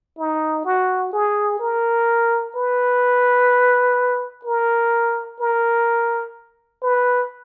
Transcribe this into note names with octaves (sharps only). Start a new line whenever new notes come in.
D#4
F#4
G#4
A#4
B4
A#4
A#4
B4